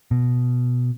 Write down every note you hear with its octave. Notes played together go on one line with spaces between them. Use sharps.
B2